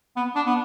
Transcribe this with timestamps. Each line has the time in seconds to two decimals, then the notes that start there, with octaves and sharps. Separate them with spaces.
0.16 B3
0.35 D4
0.46 B3